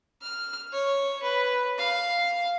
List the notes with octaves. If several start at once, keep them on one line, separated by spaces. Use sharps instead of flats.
F6
C#5
B4
F5